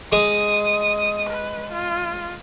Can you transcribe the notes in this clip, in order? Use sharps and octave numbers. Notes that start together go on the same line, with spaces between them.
G#3 D#6
B4
F4